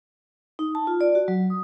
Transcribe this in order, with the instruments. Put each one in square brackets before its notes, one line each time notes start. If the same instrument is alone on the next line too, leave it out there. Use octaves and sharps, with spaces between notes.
[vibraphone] D#4
A5
F4
D5
F#4
F#3
D#6